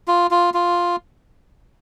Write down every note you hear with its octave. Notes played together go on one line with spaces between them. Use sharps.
F4
F4
F4